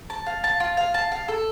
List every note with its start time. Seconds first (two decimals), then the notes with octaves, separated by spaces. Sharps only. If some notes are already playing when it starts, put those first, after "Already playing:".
0.10 A5
0.26 F5
0.44 A5
0.60 F4
0.77 F5
0.94 A5
1.12 F5
1.28 A4